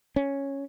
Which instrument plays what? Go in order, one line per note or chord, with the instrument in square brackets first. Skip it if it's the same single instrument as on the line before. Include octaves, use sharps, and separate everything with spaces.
[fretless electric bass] C#4